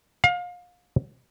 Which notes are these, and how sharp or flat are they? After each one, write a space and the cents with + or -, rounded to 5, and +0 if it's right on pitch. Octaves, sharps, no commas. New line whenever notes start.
F5 +30